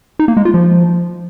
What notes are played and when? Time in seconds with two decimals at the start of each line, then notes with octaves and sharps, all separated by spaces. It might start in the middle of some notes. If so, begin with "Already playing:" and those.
0.19 D#4
0.28 A#3
0.37 G#3
0.45 F4
0.54 F3